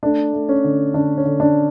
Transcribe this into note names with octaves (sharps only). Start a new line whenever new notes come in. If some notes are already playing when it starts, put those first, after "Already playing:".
A3 D4
A3
C#4
D3
D3 D4
C#4
D3
D4